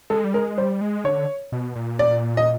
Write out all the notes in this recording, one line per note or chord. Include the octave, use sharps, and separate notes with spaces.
G#3 A4
G3
G#3 A#4
G3 C5
G#3
D3 C#5
B2
A#2
D5
D#5